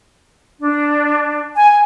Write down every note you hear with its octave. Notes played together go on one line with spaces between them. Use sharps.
D4
G#5